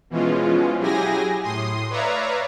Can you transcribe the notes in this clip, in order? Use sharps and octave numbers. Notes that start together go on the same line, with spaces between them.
B2 E3 F3 G#3 C#4 F4
F#3 E4 G4 G#4 G#5 A#6
A2 C6 D#6
B4 C#5 D5 E5 F5 A#5